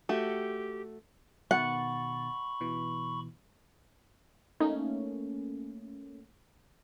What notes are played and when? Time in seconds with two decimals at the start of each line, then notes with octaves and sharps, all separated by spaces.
0.09 A3 F#4 G4
1.51 B2 D#3 F#5 B5 C#6 A6
2.61 B2 E3
4.60 A3 A#3 C#4 D#4